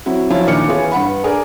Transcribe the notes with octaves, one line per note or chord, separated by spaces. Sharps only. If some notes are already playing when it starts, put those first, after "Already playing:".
F#3 C4 E4 F#4
F3 F#3 C#4 E4 F4 F5
D#2 A#2 D4 F6 C#7
E3 B3 F4 G#4 C#5
G2 B4 F#5 B5
D4 G#4 A#4 D5